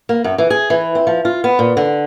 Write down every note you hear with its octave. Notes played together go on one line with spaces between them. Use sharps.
A#3
F#2
E3
G#4
E3
C4
F3
F4
B3
A#2
D3